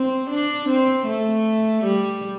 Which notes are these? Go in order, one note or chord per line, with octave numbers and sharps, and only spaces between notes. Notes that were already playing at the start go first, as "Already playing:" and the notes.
Already playing: C4
D4
C4
A3
G3